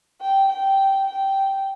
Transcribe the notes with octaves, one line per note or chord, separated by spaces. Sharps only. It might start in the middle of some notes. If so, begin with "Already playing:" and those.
G5
G5
G5